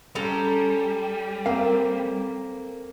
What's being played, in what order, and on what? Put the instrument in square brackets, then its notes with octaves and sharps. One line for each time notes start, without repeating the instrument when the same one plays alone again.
[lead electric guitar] G3 [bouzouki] C#4 A4 A#5
[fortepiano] A#3 [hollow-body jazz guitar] C4 F5